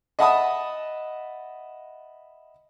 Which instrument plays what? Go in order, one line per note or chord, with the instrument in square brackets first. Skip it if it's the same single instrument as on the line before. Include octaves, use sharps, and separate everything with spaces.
[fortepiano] D#5 E5 F#5 A5 B5 D#6